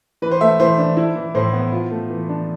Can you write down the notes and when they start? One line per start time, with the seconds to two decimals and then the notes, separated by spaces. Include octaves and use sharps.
0.22 E3 B4
0.31 C5
0.41 A3 E5
0.60 E3 C5
0.78 D4
0.97 E4
1.16 E3
1.35 A2 C5
1.53 B3
1.72 F4
1.91 A3
2.10 E3
2.29 D4